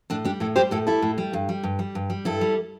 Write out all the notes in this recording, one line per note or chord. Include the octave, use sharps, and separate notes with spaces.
A2 D4
G3 D4 G4
A2 E4 A4
G3 G4 C5
A2 E4 A4
G3 E4 A4
A2
G3
G2
G3
G2
G3
G2
G3
G2 E4 A4
G3